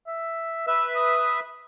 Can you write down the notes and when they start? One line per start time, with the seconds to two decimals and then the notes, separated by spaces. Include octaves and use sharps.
0.07 E5
0.67 B4 E5 E6
0.96 D#6